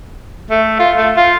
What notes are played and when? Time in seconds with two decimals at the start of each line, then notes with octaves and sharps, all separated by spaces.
0.50 A3
0.79 F4
0.97 A3
1.16 F4